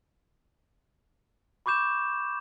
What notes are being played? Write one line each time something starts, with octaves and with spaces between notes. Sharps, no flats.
B5 C#6 D6 G6 E7